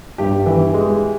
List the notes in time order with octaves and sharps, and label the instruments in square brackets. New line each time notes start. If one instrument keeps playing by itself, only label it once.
[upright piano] G2 [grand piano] G4
[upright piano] E3
G#3